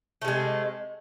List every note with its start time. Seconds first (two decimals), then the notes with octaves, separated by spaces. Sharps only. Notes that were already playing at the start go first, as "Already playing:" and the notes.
0.22 A3
0.25 C3
0.28 G#3